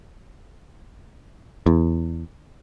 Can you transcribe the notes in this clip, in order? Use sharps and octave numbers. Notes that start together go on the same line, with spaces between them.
E2